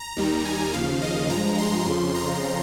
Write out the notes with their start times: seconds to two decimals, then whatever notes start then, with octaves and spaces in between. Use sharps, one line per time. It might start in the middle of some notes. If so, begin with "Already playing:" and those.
Already playing: A#5
0.17 D#2 D#3 G3
0.45 G#5
0.73 D#2 C#3 F3 F5
1.02 D#5
1.30 G2 F3 G#3 A#5
1.58 C6
1.86 F2 C#3 F3
2.15 A#5